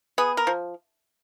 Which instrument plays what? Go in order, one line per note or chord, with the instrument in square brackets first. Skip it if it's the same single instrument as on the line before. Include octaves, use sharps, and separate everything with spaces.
[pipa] B3 G#4
A#4
F3